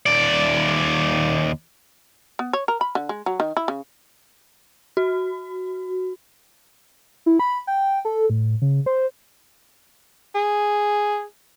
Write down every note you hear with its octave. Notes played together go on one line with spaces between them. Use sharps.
D#2 D5
B3
C#5
A#4
B5
D3
G#3
F#3
D#3
E4
C#3
F#4
E4
B5
G5
A4
A2
C#3
C5
G#4